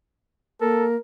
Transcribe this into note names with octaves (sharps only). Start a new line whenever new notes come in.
A#3 A4 A#4